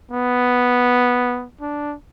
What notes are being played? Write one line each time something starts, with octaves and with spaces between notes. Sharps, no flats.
B3
D4